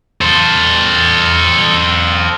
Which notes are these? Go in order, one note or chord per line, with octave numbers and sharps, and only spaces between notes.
A4 C5